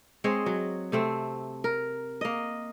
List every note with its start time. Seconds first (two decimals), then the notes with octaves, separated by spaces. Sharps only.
0.24 G#3 C4 C#5 D#5
0.46 F#3
0.92 C3 A3 C4
1.64 A#4
2.21 A#3 D#5